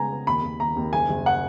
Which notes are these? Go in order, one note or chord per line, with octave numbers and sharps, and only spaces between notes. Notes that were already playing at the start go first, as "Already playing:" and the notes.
Already playing: C#3 G#3 B3 G#5 A#5
B3
D#2 B5
D#2
D#2 A#5
D#2
F#1 G#5
F#1
F#5